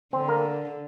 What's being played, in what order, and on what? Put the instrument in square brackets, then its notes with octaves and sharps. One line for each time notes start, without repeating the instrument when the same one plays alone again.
[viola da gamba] D3 [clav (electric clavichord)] C4 C5
[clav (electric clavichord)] A#3 A#4